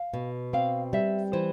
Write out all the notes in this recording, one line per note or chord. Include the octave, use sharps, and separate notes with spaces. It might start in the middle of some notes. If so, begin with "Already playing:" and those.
Already playing: F5
B2
C4 F5
G3 E5
E3 C5